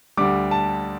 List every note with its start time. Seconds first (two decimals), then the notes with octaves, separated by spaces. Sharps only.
0.17 D2 D3 G3 D6
0.51 A5